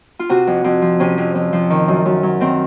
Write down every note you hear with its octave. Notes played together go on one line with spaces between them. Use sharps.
F4
C3 F#4
F2
F2 C4
F3
C3 C#4
F2
F2
F3
D#3
F#2
F#2
F#3
D#3 C4